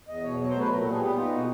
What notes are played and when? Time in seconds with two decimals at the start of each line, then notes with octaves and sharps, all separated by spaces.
0.08 E2 D#5
0.23 B2 C#5
0.39 F#3 C#5
0.49 C5
0.55 A3
0.60 B4
0.70 A#2 A#4
0.81 A4
0.86 G3 G#4
1.01 B3 G4
1.17 D#4 F4
1.32 B2 F#4